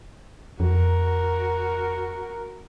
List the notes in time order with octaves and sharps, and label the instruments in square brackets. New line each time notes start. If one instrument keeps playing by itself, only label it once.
[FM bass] F2 [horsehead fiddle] F#4 A#4